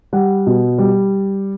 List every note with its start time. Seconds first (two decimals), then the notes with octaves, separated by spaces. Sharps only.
0.13 G3 F#5
0.47 B2
0.78 G3